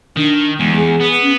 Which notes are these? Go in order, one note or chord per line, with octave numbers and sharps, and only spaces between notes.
D#3 D4
E2 G#3
G#4
B3
C#4